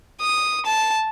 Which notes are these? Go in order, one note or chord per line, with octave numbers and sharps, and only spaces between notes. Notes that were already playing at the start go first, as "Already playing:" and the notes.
D#6
A5